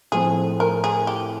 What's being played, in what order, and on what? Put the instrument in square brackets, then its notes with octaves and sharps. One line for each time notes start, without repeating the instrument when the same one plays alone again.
[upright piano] A2 F3 A3 C4 [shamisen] G#4
[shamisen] A#4
G#4
G4